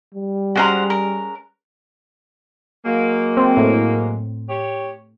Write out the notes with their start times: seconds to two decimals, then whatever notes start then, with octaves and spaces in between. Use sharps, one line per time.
0.15 G3
0.55 G#3 C#4 F#4 C5 F#5 A#5
0.90 A#4
2.85 F#3 G#3 A#3
3.37 C4
3.57 A2
4.49 G4 C#5